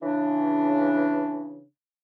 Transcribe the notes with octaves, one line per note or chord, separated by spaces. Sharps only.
C#3 E3 D4